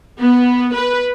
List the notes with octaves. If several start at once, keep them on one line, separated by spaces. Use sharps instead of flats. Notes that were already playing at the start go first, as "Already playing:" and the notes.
B3
B4